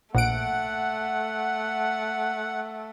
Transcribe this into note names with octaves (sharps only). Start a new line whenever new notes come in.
A#1 A3 F#5 D7